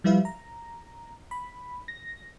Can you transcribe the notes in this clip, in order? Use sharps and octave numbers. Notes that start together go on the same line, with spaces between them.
F3 G3 E4 B4 E5 F5
A#5
B5
A#6